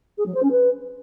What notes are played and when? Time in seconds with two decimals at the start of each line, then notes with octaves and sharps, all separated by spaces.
0.18 G#4
0.26 F#3
0.34 C5
0.43 C#4
0.51 B4